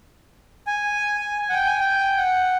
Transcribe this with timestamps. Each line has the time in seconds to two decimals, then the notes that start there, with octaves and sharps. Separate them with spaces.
0.67 G#5
1.42 G#5
1.50 F#5
1.54 G5
1.67 G#5
1.80 G5
2.17 F#5